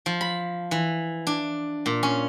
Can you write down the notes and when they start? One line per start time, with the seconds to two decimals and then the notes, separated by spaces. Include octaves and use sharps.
0.06 F3
0.21 B5
0.71 E3
1.27 D4
1.86 A#2
2.03 C#4